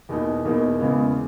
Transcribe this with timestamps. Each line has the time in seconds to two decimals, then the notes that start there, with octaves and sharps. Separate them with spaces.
0.09 E2 B2 A#3 D#4
0.45 E2 B2 A#3 D#4
0.79 E2 C#3 G#3 B3